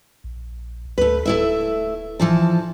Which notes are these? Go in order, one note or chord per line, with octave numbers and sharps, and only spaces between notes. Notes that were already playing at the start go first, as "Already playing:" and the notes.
A#1
D2 A3 B4
D1 A3 E4 E5
E3 F3 A5